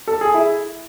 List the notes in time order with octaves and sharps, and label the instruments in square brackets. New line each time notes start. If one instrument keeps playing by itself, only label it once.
[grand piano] A4
G#4
E4